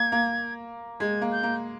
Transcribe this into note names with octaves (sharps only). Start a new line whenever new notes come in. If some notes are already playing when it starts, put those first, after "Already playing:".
Already playing: A#3 G#6
A#3
G#3 G#6
A#3
G6
A#3